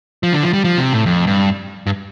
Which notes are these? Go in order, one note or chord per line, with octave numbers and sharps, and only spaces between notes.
F3
D3
F3
G3
F3
C3
A2
F2
G2
G2